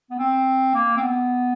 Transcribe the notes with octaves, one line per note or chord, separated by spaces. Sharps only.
B3
C4
A#3
C4
B3